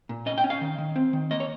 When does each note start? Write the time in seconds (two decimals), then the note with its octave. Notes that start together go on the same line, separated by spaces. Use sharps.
0.09 A#2
0.26 C#4 D#5
0.38 G5
0.44 C#4
0.50 F5
0.61 D#3
0.78 D#3
0.96 C4
1.13 D#3
1.31 A#3 D#5
1.40 C#5